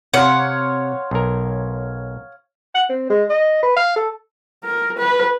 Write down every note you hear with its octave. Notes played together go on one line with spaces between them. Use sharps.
C3 C#5 F5 F#5 C6
B1 A#4
F#5
C4
G#3
D#5
B4
F5
A4
A#4
B4